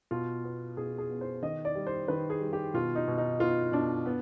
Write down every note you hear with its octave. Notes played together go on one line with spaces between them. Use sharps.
B2 F4
B3
B2 G#4
G#4
B3
C5
D#3 D#5
D5
G3
C5
D#3 B4
G#4
G3
G4
B2 F4
D#4
B2
D#4
B3 F4
B2 D4
B3